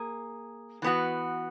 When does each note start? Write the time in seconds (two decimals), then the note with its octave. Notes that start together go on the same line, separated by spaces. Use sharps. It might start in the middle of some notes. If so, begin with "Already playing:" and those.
Already playing: A#3 G#4
0.82 E3 B3 F#4